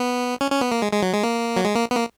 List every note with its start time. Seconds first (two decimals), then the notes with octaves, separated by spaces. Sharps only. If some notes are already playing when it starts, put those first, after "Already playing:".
Already playing: B3
0.41 C#4
0.51 C#4
0.61 B3
0.72 A#3
0.82 G#3
0.92 G#3
1.03 F#3
1.14 G#3
1.23 A#3
1.56 F#3
1.65 G#3
1.75 A#3
1.91 B3
1.96 A#3